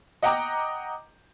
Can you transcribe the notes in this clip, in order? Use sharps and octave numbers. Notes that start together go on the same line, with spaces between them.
D#5 F#5 G5 A#5 D6